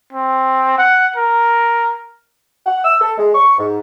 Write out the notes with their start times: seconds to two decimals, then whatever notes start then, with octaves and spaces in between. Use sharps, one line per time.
0.13 C4
0.78 F#5
1.16 A#4
2.66 F#5
2.85 E6
3.01 A4
3.18 G#3
3.35 C#6
3.59 G#2